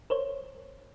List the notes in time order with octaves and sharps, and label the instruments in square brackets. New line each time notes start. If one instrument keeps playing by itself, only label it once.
[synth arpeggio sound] A#4 C5 C#5